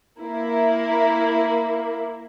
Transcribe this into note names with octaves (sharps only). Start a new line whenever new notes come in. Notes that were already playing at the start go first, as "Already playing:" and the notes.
A#3 E4